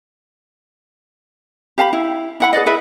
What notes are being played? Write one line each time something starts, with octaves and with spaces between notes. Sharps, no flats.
G4 F5 A5 B5
E4
E4 F#5 B5
G#4 B4 D5 D#5
E4 G#4 B4 E5